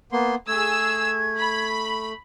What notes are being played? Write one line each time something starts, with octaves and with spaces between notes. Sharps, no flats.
A#3 B3 C6
A3 G#4 E6 G#6
B5